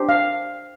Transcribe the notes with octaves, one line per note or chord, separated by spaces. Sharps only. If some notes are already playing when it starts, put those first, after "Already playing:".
Already playing: D4 G4 C5
F5